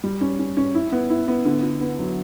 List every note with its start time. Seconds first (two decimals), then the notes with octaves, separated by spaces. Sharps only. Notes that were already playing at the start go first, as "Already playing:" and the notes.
0.04 G3
0.21 C#4
0.39 C#4
0.57 C#4
0.75 E4
0.92 B3
1.10 E4
1.28 B3
1.45 D3
1.63 D3
1.81 B3
1.99 F#3